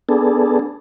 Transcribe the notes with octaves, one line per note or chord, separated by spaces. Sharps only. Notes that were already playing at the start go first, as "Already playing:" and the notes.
B3 D4 G#4 A4